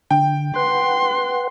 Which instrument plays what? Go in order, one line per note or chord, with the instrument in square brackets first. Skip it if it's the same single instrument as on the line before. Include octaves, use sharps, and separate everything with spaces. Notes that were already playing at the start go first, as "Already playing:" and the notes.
[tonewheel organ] D3 [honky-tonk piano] G5
[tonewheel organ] B4 F#5 [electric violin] C6